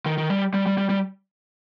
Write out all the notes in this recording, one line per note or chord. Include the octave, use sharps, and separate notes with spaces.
D#3
D#3
G3
G3
G3
G3
G3